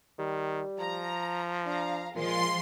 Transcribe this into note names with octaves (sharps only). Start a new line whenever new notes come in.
D#3 G3
F3 A#5
D4 F5 A#5
A#2 F3 G#3 F4 C6